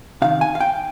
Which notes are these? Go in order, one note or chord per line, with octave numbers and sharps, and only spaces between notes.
C3 D#3 F5
G#5
F5
G5